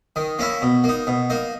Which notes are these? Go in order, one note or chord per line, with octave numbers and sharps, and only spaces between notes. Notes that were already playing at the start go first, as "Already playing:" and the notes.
D#3
A#3 C#4 E4
B2
A#3 D#4
B2
A#3 D#4